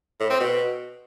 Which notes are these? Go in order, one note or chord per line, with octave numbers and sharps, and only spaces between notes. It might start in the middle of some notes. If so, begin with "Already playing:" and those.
A2
C4
B2